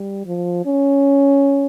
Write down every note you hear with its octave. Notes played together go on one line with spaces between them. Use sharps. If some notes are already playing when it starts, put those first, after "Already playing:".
Already playing: G3
F3
C#4